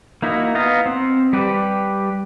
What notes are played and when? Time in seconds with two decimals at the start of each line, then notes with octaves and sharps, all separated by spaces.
0.22 A#3 D#4 E4 F#4
0.55 B3 D#5 F5 A#5
0.86 C4
1.33 G3 G4 B4